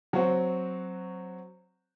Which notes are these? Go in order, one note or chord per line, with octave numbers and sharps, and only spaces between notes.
F#3 C4 F#4 C5